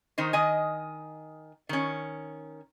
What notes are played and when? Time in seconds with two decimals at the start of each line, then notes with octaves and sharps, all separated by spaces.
0.18 D#3 D#4 C5
0.33 D#3 D#5 G#5
1.69 D#3 C#4